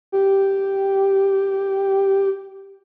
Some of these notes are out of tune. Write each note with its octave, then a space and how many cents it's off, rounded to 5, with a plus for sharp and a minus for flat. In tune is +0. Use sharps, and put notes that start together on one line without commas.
G4 -5